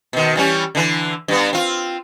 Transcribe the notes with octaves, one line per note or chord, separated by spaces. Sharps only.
B2 D#3
E3 G3 C#4
D3 E3
G2 B3
C4 F4